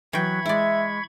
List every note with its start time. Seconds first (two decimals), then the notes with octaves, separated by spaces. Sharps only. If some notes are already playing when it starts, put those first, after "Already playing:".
0.13 E3 F#3 G5 B5 C#6 G#6
0.46 G#3 E4 D5 E5